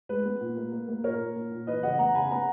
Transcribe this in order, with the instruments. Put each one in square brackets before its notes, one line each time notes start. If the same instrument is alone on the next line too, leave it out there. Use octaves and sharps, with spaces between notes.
[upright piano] G#3 B4
B3
A#2
A#3
A#3
A#3
A#2 A#4 C#5
A#2
A#2
A#2
E3 B4 D#5
C#3 D#5 F#5
B3 F#5 A#5
C#3 G#5 B5
B3 F#5 A#5